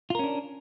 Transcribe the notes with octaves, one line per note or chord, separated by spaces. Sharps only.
C#4 D4 F4 A#4